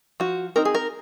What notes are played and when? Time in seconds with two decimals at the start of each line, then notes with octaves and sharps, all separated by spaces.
0.20 F3 F#4
0.56 C4 D#4 A#4
0.65 G#4
0.75 A#4